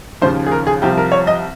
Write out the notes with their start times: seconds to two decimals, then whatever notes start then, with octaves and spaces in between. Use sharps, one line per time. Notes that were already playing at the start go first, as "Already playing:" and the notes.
0.21 D#2 C#3 F3 C5
0.46 G#4
0.52 A#4
0.67 G#4
0.82 C2 C3 F3 G4
0.98 A#4
1.12 C#5
1.27 D#5